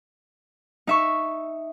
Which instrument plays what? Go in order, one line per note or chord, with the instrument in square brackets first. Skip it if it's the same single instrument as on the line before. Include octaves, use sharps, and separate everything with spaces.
[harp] D#4 E5 C#6